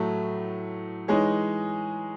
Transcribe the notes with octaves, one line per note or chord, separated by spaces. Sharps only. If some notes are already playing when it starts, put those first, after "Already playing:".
Already playing: A2 F#3 A3
E3 G#3 D#4 G#4 C#5